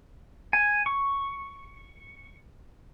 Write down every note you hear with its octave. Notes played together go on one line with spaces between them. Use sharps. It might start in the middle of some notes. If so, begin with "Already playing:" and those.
G#5
C#6